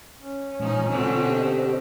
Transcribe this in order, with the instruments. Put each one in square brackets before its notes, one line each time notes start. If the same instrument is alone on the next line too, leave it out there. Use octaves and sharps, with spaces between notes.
[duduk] C#4
[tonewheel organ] A#2 E3 G#3 [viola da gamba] F3 D#4
[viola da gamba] B2 D3 C4 [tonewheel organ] F4
[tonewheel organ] G4 C5 D#5